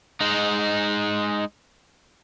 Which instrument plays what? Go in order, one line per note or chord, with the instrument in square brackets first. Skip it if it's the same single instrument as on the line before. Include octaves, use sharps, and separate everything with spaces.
[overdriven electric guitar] G#3 D#4